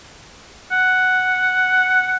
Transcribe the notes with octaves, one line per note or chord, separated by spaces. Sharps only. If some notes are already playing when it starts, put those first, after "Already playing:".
F#5